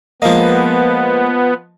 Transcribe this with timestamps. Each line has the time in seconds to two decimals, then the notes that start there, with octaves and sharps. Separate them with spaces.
0.22 F3 G#3 A#3 B3 D#5